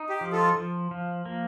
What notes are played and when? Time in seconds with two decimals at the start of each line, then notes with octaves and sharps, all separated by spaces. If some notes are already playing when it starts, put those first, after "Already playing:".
Already playing: D#4
0.09 G4
0.21 F3
0.32 F4 A4
0.56 F3
0.91 F3
1.26 A#3